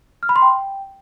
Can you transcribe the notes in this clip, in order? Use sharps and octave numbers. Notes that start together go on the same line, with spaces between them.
F6
B5
C6
G5